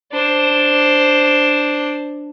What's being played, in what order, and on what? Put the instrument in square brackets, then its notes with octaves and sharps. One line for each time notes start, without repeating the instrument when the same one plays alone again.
[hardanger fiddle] D4 C5